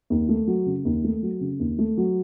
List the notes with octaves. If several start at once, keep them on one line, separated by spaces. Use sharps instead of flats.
D#2
A3
F#3
C#3
D#2
A3
F#3
C#3
D#2
A3
F#3